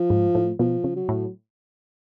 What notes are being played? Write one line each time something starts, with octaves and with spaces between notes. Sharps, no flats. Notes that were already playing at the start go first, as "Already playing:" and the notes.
Already playing: F3
G#2
A2
B2 F3
C#3
F#3
A2